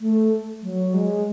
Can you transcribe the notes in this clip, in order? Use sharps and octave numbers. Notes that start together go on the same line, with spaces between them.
A3
F#3
G#3